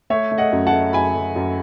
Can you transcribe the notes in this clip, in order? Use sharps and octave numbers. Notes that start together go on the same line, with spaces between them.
A3 C#5 E5
A3
D#5 F#5
F#2
F#5 A5
A3
F#2 G#5 B5
F#2
F#2